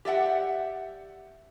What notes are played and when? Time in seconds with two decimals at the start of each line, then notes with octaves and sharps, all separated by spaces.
0.05 G4 D5 E5 F#5